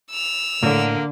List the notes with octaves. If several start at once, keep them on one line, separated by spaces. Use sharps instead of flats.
E6 F7
A2 D3 A#3